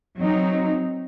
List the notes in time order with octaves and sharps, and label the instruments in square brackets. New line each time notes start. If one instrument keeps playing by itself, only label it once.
[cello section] F#3 C4 D#4